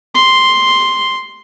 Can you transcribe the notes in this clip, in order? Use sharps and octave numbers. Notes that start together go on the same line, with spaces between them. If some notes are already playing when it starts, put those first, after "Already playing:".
C6